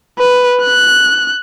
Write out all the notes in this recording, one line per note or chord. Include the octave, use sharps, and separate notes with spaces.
B4
F#6